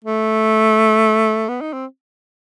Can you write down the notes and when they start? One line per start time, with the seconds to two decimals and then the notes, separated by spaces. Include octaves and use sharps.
0.04 A3
1.49 B3
1.61 D#4
1.73 C4